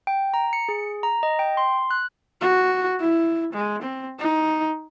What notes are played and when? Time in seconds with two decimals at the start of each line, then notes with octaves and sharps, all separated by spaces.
0.07 G5
0.34 A#5
0.53 C#7
0.69 G#4
1.03 A#5
1.23 D#5
1.39 G5
1.57 C6
1.91 F#6
2.41 F#4
3.00 E4
3.53 G#3
3.82 C4
4.19 D#4